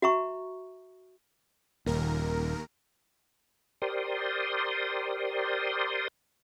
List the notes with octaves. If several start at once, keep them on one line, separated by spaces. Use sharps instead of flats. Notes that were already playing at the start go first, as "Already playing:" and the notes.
F#4 E5 A#5 C#6
D#1 D#2 A#4
G4 A#4 C5 D5 C6 D#6